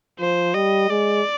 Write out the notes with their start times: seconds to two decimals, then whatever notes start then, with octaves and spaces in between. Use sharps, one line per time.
0.19 F3 C5
0.54 G3 D#5
0.90 G#3 D5